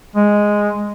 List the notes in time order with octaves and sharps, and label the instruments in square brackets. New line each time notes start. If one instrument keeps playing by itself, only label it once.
[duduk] G#3